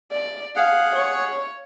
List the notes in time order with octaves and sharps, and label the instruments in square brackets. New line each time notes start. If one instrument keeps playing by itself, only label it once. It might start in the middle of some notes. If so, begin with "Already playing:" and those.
[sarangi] D5
[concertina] G#4 F#5 [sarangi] F5
[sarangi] C#5